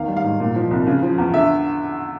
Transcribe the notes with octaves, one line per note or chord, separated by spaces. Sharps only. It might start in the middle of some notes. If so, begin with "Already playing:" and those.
Already playing: E2 D#3 F5
G3
F5
G#2
A#2
F3
C2
C#3
F3
E2
D3 E5